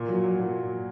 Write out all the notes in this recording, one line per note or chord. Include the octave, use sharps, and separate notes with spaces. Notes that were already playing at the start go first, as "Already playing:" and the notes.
Already playing: A#2
F#3
F#3
A#2